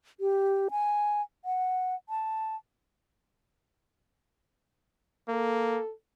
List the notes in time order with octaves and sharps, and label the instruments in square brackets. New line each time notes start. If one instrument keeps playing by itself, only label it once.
[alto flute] G4
G#5
F#5
A5
[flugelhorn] A#3 [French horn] A4